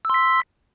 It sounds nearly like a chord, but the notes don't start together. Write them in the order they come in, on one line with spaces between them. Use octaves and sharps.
E6 C6 B6